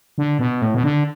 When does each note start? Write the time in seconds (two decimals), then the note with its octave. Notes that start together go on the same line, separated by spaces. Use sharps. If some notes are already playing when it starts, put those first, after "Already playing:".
0.18 D3
0.39 B2
0.62 A2
0.74 B2
0.84 D3